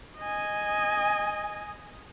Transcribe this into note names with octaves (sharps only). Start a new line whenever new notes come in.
D#5 G#5